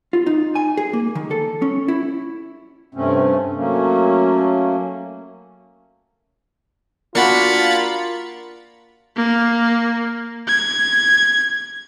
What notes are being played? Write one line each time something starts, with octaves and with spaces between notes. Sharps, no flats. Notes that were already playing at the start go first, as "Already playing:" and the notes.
F4
D#4
G#5
G#4
A#3
D#3
A4
C#4
E4
G2 C3 A3 C4 C#4
F#3 A3 A#3 C#4
A#3 D4 F4 F#4 A5 B5 A6 C#7
A#3
G#6